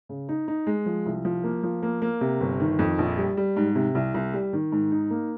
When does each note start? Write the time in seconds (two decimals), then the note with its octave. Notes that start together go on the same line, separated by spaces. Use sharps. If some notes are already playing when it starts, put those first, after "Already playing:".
0.09 C#3
0.29 D#4
0.48 D#4
0.67 G#3
0.86 F3
1.06 C2
1.25 F3
1.44 A#3
1.64 F3
1.83 A#3
2.02 A#3
2.21 C3
2.41 G1
2.60 D#3
2.79 F2
2.98 A#1
3.18 G3
3.37 G3
3.56 G#2
3.75 C3
3.95 C2
4.14 C2
4.34 G3
4.53 D#3
4.72 G#2
4.92 D#4
5.11 A#3